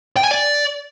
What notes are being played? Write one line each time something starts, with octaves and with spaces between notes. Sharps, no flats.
G5
G#5
D5